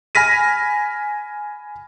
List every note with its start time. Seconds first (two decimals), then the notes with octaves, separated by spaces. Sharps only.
0.15 G#5 B5 F6 A#6 B6 D#7